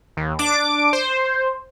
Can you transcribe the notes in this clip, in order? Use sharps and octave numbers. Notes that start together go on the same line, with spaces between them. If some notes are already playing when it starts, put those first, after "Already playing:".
D#2
D4 D6 D7
C5